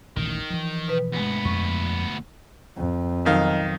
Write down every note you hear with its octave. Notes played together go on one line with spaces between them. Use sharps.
D#1 A1 B2 D#3
E3 F3
B2 B4
D2 G2 G#3 B3
F2 C#6
F2
B1 D#3 F5